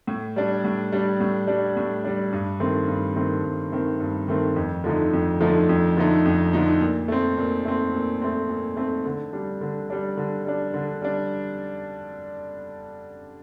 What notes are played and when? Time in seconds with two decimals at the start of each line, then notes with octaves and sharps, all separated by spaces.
0.07 A2
0.36 G3 D4
0.64 A2
0.92 G3 D4
1.20 A2
1.47 G3 D4
1.77 A2
2.04 G3 D4
2.33 G2
2.60 D#3 A3 C4
2.88 G2
3.16 D#3 A3 C4
3.44 G2
3.72 D#3 A3 C4
4.00 G2
4.28 D#3 A3 C4
4.56 F2
4.84 D3 F3 A3 D#4
5.13 F2
5.40 D3 F3 A3 D#4
5.69 F2
5.97 D3 F3 A3 D#4
6.25 F2
6.53 D3 F3 A3 D#4
6.80 A#2
7.08 A3 C4
7.38 A#2
7.65 A3 C4
7.93 A#2
8.22 A3 C4
8.49 A#2
8.77 A3 C4
9.06 D3
9.33 G3 D4
9.61 D3
9.90 G3 D4
10.17 D3
10.45 G3 D4
10.74 D3
11.02 G3 D4